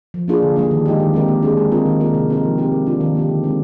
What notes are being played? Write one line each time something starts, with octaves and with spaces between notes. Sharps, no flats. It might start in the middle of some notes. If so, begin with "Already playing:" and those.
F3
A#3 D4 F4 G#4
D3
G3 A#3 D4
D#3
G#3 D#4 G4
D#3
G#3 C4 G4 A#4
A#3
D4 G#4
G#3
C4 F4 A#4
D#3
A#3 F4 A#4
C3
G3 C4 D#4 A#4
F3
C4 G4 A#4
G#3
D4 F4
D#3
A#3 D#4 G4
D3
G#3 C4